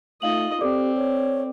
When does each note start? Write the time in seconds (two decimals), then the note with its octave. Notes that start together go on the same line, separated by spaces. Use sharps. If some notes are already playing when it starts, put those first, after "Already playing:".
0.22 A3 D#4 F4 D#5 F5 F#7
0.61 C4 G4 A4 D5 D6
0.96 C#5